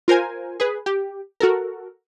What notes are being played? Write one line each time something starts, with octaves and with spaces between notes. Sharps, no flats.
F4 A#4 C5 G#5
G#4 B4
G4
F#4 A4 A#4